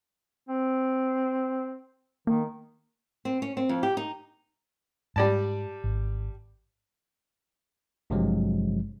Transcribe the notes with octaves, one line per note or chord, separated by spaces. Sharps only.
C4
D#3 A#3
C4
C#4
C4
F2
G4
D#4
G#2 G3 D5 A5
G#1
G#1 G2 C3 F3 F#3 G#3